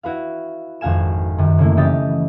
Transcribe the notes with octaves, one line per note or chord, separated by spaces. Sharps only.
E4 F#4 B4 F5
G#1 F2 F#4 F5 G#5 E7
F#2 D#3 G3
C#3 A3 A#3 E4
C#3 E3 G3 G4 D#5 A6